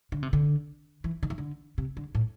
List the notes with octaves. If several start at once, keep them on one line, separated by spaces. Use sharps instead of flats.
D3
C3
D3
E3
D3
E3
D3
C3
D3
A2